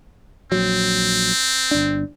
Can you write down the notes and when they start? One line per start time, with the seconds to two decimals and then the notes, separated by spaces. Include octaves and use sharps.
0.52 A#1 F#3 C4
1.71 G1 D4